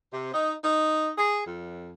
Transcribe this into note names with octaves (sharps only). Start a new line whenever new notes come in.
C3
D#4
D#4
G#4
F2